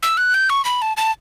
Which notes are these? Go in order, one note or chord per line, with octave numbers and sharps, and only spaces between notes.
E6
F#6
G6
C#6
B5
A5
A5